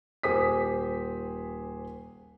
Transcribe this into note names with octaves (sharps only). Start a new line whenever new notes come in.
D#1 G4 G#4 C5 D#6 B6